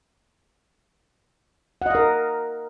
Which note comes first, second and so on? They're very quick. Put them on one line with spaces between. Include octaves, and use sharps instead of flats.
F#5 D#5 F5 A#4